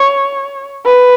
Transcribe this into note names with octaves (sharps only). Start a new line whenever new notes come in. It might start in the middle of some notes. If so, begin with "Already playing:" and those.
Already playing: C#5
B4